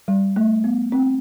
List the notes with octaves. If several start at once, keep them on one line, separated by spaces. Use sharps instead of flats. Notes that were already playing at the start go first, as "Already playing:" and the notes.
G3
A3
B3
C4